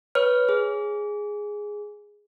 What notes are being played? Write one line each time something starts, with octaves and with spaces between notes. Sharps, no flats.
B4 C#5 F6
G#4